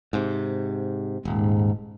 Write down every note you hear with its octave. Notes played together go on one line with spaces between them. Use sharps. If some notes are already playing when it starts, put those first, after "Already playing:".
G#2 C3
D#1 G#2